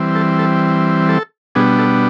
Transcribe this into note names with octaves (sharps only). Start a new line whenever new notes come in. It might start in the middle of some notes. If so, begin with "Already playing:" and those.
Already playing: E3 G3 C4
A4
A4
A4
B2 G3 B3 D4 G#4
A4